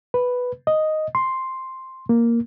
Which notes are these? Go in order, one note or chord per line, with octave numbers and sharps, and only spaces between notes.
B4
D#5
C6
A#3